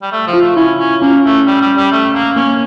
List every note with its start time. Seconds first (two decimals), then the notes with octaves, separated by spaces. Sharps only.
0.02 G3
0.12 A3
0.27 F3
0.33 F4
0.41 A3
0.57 C#4 E4
0.79 C#4
1.01 A#3 C#4
1.25 A3
1.47 G3
1.61 G3
1.77 G3
1.92 A3
2.14 A#3
2.36 A#3 C#4